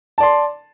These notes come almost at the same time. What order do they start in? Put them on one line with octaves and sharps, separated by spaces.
A5 D5 C6